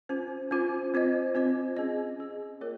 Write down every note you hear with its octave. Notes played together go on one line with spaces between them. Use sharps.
C#4 F4 C5
C#4 F4 C5
C4 F4 C5 D#5
C4 F4 C5 D#5
C#4 G#4 D#5
C#4 G#4 D#5
A#3 F4 A#4 C#5